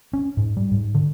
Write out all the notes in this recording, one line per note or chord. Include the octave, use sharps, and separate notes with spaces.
C#4
G#2
G3
G#2
D3